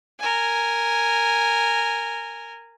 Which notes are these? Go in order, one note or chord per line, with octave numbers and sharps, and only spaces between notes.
A#4 G#5